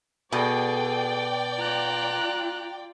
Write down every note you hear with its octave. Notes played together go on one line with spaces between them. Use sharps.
B2 G#4 A4 D5 G5
F4 A#5 F#6